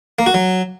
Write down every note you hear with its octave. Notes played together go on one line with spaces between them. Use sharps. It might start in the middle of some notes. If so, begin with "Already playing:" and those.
A#3
F#4
F#3